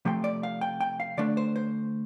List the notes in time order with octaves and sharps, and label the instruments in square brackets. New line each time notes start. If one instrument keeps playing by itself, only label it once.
[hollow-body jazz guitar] C3 F3 A3 C4 G5
D5
F5
G5
G5
F5
D3 A3 D4 D5
C5
C5